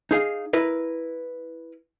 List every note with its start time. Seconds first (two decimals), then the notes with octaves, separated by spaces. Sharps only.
0.11 D#4 G#4 F5
0.53 E4 A#4 B4